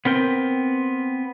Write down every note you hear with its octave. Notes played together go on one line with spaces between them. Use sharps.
B3 C4 A#4 G5